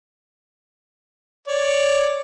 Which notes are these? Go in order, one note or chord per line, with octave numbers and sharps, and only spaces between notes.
C#5 D5